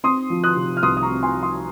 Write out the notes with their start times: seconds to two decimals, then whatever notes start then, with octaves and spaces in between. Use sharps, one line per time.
0.04 C4 C6 D#6
0.30 F3
0.44 D#6 F#6
0.56 C3
0.77 F6
0.83 C2 C6 D#6
0.97 D#6
1.03 A#5 C#6
1.10 C4
1.23 G#5 C6
1.36 F3
1.43 C6 D#6